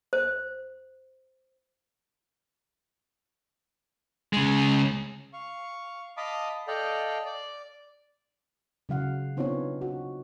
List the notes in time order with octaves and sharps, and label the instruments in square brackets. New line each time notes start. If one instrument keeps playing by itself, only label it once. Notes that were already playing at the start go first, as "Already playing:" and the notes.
[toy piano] C5
[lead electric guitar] C#3 G#3
[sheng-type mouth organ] F5 C#6
D#5 F5 A5 B5 D6 D#6
A4 D5 D#5 F5 G5
D5
[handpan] C#3 F#3 F5 F#5
B3 C4 D4 D#4 F4 C#5
F#4